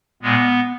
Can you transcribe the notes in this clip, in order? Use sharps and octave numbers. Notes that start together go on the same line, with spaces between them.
A#2 G#3 B3